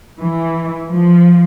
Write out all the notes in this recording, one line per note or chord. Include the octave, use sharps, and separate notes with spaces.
E3
F3